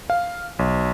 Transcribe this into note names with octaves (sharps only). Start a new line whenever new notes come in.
F5
B1